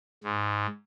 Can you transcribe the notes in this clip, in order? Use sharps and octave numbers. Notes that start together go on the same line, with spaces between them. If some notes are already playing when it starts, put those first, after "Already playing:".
G#2